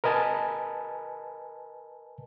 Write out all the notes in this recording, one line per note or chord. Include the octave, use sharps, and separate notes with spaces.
A#4 B4 D#5 G#5 A5